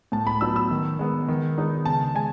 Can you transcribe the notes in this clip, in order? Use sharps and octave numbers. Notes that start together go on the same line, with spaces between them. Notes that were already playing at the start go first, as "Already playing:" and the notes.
A2 A5
B5
F#3 B3 D#4 E6
E6
D#3
G#3 B3
D#3
G#3 B3 D#4
C#3 A5
G#3 G#5